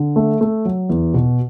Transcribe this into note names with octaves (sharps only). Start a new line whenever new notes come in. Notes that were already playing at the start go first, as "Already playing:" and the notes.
Already playing: D3
A3
A3
F#3
E2
B2